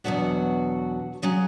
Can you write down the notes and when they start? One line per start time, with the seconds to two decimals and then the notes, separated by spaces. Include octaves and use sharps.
0.04 E2 B2 F#3 B3 D4 F#4
1.22 C#3 F#3 C#4 G#4